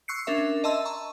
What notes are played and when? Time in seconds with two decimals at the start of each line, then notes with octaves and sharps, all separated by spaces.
0.08 C#6 E6 F#6 C7 C#7
0.27 C#4 D4 A#4 E5
0.64 D#5 E5 A5 C6 E6
0.85 A#5 C#6